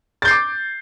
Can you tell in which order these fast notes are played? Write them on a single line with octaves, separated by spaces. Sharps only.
A6 G6 C7 D6